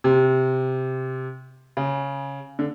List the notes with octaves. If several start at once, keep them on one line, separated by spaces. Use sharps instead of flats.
C3
C#3
D3